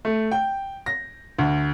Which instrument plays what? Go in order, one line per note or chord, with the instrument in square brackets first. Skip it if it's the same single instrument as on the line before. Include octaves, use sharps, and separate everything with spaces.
[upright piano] A3
G5
A#6
D2